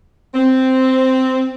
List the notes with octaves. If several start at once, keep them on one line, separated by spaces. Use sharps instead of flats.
C4